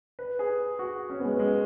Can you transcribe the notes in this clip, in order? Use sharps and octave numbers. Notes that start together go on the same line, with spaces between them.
B4
G#4
F#4
C#4
B3
G#3
B3
G#3